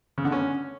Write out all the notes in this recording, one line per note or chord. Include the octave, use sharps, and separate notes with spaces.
C#3
D3
C#4